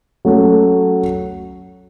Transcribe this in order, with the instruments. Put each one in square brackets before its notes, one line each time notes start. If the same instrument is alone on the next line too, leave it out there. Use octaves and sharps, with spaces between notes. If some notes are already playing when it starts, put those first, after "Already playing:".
[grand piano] F#3 A3 C#4 F#4 A4